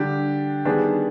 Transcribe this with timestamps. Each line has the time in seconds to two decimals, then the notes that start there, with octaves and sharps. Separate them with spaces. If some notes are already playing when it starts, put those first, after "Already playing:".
Already playing: D3 G3 D4 G4
0.65 D#3 G3 B3 D4 G#4